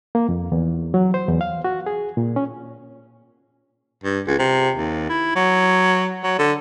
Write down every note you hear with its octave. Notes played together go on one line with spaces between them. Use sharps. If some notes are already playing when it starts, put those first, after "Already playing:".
A#3
F2
E2
F#3
C5
E2
F5
F#4
G#4
A#2
C#4
G2
C#2
C3
D#2
E4
F#3
F#3
D3